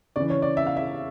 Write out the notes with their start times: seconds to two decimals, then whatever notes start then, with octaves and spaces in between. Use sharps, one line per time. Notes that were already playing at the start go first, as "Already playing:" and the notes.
0.16 C#3 E3 D5
0.30 C#5
0.42 D5
0.57 E5
0.67 F5
0.77 E5